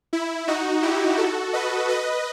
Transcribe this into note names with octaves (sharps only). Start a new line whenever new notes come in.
E4
D#4 F#4
E4 G4
F#4 A4
B4 D#5
B4 D#5